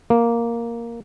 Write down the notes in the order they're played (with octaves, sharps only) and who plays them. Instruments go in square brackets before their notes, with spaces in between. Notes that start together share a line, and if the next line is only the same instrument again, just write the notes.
[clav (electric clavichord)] A#3